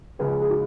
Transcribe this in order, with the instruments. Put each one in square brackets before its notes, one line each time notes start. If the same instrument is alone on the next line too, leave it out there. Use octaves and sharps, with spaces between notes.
[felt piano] C#2 C#3 F3 G#3 [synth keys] G#4 B4
[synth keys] G#4
D#4 F#4